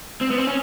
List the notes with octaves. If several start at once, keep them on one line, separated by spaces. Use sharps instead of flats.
C4
B3
C4
C#4